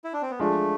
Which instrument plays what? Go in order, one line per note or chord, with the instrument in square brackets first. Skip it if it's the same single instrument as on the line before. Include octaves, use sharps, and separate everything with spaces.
[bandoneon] E4
D4
C4
B3
[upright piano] F3 G#3 D4 [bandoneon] A3